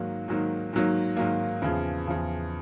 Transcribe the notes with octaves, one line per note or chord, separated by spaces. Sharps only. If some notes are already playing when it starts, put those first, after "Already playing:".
Already playing: G#2 D#3 F#3 A#3
G#2 D#3 F#3 A#3
G#2 D#3 F#3 A#3
G#2 D#3 F#3 A#3
E2 C#3 F3
E2 C#3 F3